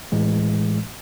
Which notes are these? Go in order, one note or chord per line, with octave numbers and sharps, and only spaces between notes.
A2 E3 G#3